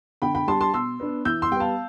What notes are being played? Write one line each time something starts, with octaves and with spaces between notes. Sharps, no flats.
D3 G5 B5
G5 B5
G3 D4 A5 C6
A5 C6
B2 C6 E6
B3 D4
E3 E6 G6
C6 E6
G3 B3 F5 G5 A5